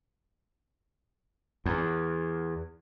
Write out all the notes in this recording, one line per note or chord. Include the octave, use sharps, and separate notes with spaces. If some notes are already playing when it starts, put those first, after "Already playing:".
E2